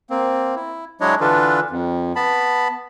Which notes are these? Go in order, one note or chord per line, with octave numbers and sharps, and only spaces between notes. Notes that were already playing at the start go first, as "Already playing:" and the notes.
A#3 C4
E4
F#3 G#3 D4 E4 C#5 D#5
D3 E3 D4 F4 A4 B4
F2
B3 A5 B5